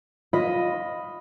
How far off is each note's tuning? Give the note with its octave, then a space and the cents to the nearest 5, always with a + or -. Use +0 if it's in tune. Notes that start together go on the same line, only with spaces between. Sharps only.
F4 +20 D#5 +0 B5 +0